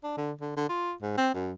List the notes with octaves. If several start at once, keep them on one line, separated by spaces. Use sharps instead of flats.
D4
D3
D3
D3
F4
G#2
C4
F#2